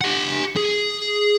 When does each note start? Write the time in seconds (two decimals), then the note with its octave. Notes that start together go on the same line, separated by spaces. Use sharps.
0.01 G4 F#5
0.57 G#4